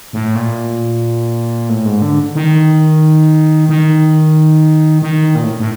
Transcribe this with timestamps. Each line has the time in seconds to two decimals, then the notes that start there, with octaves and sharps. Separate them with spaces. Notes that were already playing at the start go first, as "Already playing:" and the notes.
0.13 A2
0.35 A#2
1.69 A2
1.85 G#2
2.02 D3
2.35 D#3
3.69 D#3
5.02 D#3
5.35 A#2
5.43 A2
5.60 A2